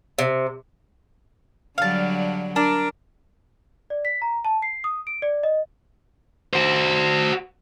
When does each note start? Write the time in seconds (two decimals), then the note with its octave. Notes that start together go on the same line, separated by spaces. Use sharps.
0.19 C3
1.78 D3 F#3 G3 F5 A5
2.56 D4 A#4
3.90 D5
4.05 B6
4.22 A#5
4.45 A5
4.62 C7
4.84 D#6
5.07 D7
5.22 D5
5.43 D#5
6.53 F#4 C5